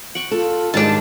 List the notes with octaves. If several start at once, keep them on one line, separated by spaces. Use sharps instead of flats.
F#5 G5 C#6
F4 A4
G#2 D#3 G3 G#3 D4 A5